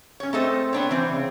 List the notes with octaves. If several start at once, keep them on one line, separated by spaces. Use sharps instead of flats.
C#4 C#5
A3 C4 A4 D#5
B3 D4 C#5
E3 C4 C5
C#3